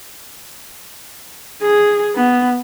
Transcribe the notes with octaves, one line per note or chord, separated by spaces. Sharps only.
G#4
B3